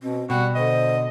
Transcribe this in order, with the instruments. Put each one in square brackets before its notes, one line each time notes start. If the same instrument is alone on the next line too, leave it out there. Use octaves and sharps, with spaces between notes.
[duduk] B2 [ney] C4
[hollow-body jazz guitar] B2 [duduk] G3 [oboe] F#4 [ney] G5
[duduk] D3 [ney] C5 [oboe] D#5